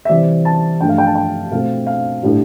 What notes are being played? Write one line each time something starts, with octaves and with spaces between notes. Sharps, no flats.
E5
C3 E3 G3 C4 D5
A5
G2 F3 A3 G5
F5
G5
A5
G5
B2 A3 C4 F5
F5
A2 G3 D4